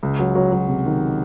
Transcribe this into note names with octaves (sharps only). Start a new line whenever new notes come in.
C#2
F#3
F#3
F#3
C3
D#3